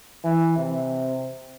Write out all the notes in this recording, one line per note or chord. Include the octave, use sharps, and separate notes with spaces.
E3
C3